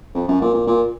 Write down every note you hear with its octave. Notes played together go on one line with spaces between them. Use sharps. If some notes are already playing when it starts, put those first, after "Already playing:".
F2
F#2
A#2
A#2
A#2